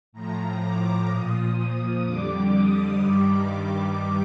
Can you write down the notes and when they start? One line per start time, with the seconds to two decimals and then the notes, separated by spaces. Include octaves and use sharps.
0.12 A2 F3 A#5
0.60 D6
1.08 A#2 F3 D#6
2.04 F2 D3 G3 D6
2.53 D#6
3.00 G2 D#3 G3 D6
3.48 D6